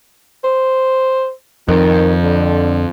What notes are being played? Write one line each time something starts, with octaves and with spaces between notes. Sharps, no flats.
C5
F2 D#3
D3